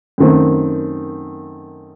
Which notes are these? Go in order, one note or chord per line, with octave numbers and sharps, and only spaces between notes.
F#2 D#3 A3 C4